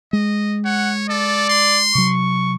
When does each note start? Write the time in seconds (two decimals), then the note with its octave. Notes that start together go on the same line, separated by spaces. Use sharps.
0.13 G#3 D#5
0.65 C#5 F#5
1.09 A4 D5
1.50 C6
1.95 C3 F#3 C#6